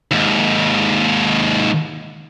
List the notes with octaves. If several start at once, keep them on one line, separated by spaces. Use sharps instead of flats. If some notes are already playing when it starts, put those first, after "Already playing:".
D#2 G#2